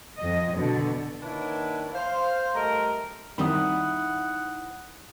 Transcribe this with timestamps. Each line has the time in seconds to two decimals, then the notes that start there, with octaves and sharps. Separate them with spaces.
0.19 F2 D#5
0.59 B2 D3
1.22 D#3 A#3 D4 E4 B4 C#5
1.94 C5 F5
2.55 G3 A3 A#4 D#5 A#5
3.38 D#3 G3 C4 D#4 E4 F#5 B5 D#6